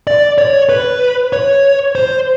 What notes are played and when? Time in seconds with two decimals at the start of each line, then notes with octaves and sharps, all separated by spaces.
0.07 D5
0.38 C#5
0.69 B4
1.33 C#5
1.95 C5